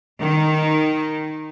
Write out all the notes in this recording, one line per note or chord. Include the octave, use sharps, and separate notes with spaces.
D#3